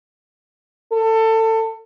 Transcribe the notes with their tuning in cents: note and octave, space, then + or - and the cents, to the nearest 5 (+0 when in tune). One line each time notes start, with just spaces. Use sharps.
A4 +25